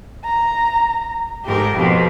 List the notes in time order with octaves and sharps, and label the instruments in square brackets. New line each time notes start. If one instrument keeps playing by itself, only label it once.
[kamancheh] A#5
[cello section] G#2 A#4 [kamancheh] G4 A4
[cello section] F2 B2